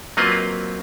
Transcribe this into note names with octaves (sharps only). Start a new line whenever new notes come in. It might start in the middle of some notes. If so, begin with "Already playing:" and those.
F#3 A#3 C4 F4 B4 D#5